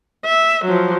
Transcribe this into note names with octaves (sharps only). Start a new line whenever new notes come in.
E5
F3 F#3